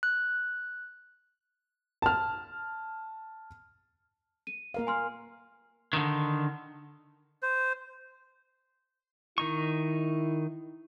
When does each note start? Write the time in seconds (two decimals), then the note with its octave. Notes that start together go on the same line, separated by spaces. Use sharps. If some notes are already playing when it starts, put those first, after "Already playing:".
0.03 F#6
2.02 A5 F6
4.47 D#7
4.74 A#3 A#4 F5
4.87 G#5 C6 F6
5.93 D3 D#3
7.43 C5
9.38 D#3 D#4 E4 C#6